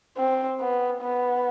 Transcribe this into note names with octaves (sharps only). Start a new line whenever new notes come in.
C4
B3
B3